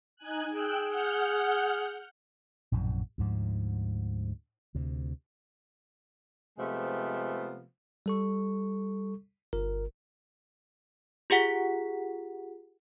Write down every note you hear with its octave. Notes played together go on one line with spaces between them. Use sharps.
D#4 G#5 F#6
G#4 G5 E6 F#6
F#5 F6 G6
A#1 F#2 A2 C3
D2 G#2 F3
D2 C3
C3 F3 G#3 A3 B3
G3 A4 C#6
G1 A#4
F4 G4 G#4 F#5 B6